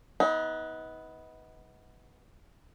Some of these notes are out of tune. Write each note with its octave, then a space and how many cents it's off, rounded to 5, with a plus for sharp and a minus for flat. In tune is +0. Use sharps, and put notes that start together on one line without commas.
B3 +0 D#4 +35